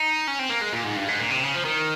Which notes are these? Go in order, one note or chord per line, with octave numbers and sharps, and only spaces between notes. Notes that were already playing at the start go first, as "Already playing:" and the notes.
Already playing: D#4
C#4
C4
A#3
G#3
A#2
G#2
G2
G#2
A#2
C3
C#3
F3
D#3